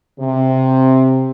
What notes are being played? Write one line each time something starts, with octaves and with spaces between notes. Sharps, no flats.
C3